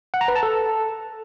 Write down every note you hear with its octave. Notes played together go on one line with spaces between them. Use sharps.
F#5
A#5
B4
A5
A4